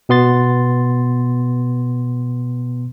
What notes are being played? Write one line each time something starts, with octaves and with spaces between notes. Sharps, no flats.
B2 B3 C6 A6